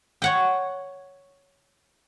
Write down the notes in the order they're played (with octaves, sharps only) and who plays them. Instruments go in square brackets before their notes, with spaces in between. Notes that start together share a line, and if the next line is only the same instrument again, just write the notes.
[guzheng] C#5 F#5 G5